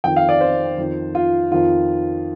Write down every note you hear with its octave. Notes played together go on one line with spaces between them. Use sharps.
F2 D#3 G5
F5
D5
C5
F2 D#3
F4
F2 D#3 F4